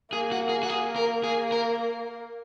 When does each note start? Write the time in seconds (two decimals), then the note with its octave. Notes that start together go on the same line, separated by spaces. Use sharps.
0.12 A#3 G#4
0.32 F#4
0.49 G#4
0.63 F#4
0.69 A#3 G#4
0.96 A#4
1.24 G#4
1.52 A#4